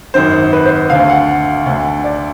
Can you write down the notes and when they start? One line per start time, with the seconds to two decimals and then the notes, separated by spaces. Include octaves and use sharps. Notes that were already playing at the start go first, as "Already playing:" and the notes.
0.14 G#1 F#2 D#3 C5
0.53 B4
0.65 C5
0.90 D2 D3 F5
1.10 F#5
1.66 D2 D3
2.04 D5